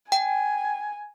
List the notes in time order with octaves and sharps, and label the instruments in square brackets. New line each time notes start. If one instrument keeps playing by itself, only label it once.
[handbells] G5 [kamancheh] G#5